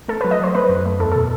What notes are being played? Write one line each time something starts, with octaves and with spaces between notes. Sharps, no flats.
A3 A4
B4
F#3
D#5
F#3 C5
A3 B4
F#2
A3
E2 A4
A4
B2